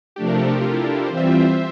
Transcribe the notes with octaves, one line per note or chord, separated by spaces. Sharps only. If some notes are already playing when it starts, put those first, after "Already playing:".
C3 F3 A3 D4 G4
A#4
A4
G4
F4
E4
D4
E4
E3 G3 C4 F4 C5
E5
E5
C5